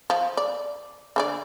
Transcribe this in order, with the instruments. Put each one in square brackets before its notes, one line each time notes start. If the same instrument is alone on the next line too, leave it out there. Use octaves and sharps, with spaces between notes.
[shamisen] F3
D5
D3 D4 D5